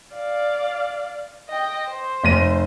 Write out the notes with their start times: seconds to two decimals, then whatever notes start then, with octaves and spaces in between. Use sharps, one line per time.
0.15 D5 F5
1.49 D#5 G5
1.89 C5
2.23 F1 A#6 D#7